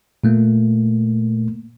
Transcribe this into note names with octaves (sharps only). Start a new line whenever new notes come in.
A#2 A3 A#3